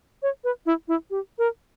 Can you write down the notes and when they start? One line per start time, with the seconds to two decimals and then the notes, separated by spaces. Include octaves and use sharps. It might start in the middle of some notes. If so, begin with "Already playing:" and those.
0.22 C#5
0.44 B4
0.66 E4
0.88 E4
1.10 G4
1.38 A#4